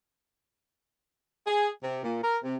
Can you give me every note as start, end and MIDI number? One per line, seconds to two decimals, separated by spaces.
1.46 1.68 68
1.81 2.03 48
2.03 2.19 46
2.22 2.37 70
2.42 2.56 48